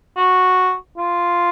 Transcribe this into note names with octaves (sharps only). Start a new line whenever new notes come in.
F#4
F4